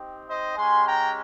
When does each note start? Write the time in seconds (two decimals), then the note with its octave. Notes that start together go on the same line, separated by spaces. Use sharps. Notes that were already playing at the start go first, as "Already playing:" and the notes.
Already playing: C4 D#4 G4
0.28 C5 D#5
0.57 G#3 C#4 G4 G#5 C6
0.85 G5 A#5